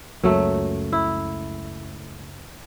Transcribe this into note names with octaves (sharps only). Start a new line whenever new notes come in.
C#2 F#2 F#3 A3 A#3
E4